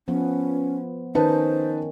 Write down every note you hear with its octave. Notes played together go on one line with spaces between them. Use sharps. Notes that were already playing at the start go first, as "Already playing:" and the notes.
F3 B3 C#4
D#3 C#4 D#4 B4 C5 A5